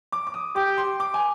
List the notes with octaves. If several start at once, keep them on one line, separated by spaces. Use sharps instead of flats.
D6
D6
D#6
G4 D6
C6
D6
G#5